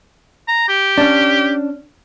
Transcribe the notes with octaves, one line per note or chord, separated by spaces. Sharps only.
A#5
G4
C#4 D4